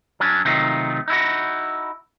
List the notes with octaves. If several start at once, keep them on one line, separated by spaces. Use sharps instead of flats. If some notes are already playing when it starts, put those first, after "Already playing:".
F#3 C#4 D4
C3 D#3 F#3 A3 D#4 F4
D#4 E4 F#4